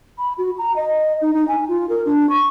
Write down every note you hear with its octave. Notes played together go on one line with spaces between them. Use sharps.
B5
F#4
A#5
D#5
D#4
D#4
G#5
F4
A#4
D4
C#6